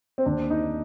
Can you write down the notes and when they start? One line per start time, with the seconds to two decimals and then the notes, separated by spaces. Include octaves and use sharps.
0.18 C4
0.26 D#2 D4
0.50 D#4